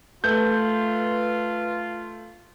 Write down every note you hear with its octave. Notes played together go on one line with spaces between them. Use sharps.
A3 F4 B4 G6